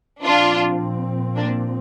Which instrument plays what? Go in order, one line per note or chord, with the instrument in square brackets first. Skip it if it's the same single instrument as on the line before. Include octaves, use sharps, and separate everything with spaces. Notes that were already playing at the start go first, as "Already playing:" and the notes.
[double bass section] A#2 F3 C4 [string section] D4 F4
[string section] A#3 D4